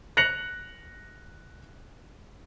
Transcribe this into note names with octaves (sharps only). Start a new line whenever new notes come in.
F#6 A#6 C#7 F7 F#7